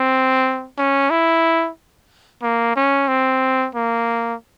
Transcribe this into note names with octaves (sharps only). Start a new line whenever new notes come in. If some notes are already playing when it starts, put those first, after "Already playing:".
Already playing: C4
C#4
E4
A#3
C#4
C4
A#3